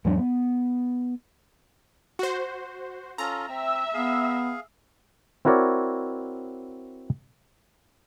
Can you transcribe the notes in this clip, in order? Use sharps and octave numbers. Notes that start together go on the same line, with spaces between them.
E2 G#2 F#3 D4
B3
F#4 C5
C#4 F4 A4 A#5
C4 E5
B3 G#4 F5
C4 E4 F#4 A#4 C#5 D5